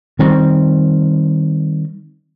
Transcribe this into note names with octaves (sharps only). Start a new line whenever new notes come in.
D#3 G3 C4